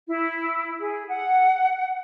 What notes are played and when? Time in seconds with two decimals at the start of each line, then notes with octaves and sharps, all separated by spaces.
0.07 E4
0.80 G#4
1.09 F#5